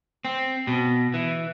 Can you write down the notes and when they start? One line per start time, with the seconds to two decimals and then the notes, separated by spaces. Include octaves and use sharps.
0.25 C4
0.67 B2
1.14 E3